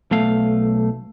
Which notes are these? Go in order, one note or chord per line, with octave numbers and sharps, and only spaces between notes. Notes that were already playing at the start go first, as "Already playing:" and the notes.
B1 A3 F5